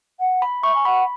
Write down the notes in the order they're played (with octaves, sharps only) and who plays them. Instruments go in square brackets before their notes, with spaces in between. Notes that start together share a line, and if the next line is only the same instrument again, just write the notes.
[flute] F#5
[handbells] B5
[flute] E5 [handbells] C#6
[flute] G#5
[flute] F#5 [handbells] B5